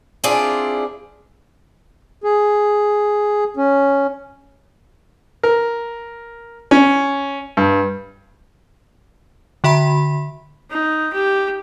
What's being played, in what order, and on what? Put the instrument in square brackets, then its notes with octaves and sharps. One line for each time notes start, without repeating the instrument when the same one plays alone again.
[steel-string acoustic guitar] C4 D4 E4 F4 G#4 D5
[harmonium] G#4
C#4
[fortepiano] A#4
C#4
G2
[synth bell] D3 F#4 E5 B5
[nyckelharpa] D#4
G4